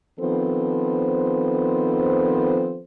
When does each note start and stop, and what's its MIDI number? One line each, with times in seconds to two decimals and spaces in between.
0.19 2.81 51
0.19 2.81 53
0.19 2.81 59
0.19 2.81 60
0.19 2.81 69
0.19 2.81 72